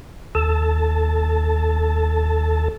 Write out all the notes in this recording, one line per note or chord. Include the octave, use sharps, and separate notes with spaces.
D#2 A4 A5